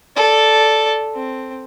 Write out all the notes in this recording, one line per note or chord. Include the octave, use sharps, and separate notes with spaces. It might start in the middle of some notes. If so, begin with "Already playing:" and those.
A4 D5
C4